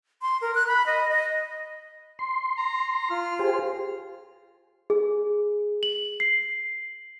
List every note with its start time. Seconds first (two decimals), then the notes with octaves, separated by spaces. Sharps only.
0.22 C6
0.41 A#4
0.55 F#6
0.67 B5
0.86 D#5
1.10 D#5
2.19 C6
2.57 A#5
3.10 F4 F6
3.39 G4 G#4 C5
4.90 G#4
5.83 F#7
6.20 C7